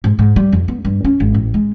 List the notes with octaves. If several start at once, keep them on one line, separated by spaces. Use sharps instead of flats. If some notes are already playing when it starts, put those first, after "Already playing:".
G#2
G#2
G3
F2
B3
G2
C#4
G#1
A1
G#3